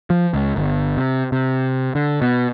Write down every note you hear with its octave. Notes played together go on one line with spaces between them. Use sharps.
F3
C#2
G1
C3
C3
D3
B2